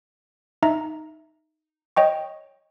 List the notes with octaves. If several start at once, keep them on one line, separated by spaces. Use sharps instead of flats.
D#4 E5 A#5
C#5 D#5 G5 C#6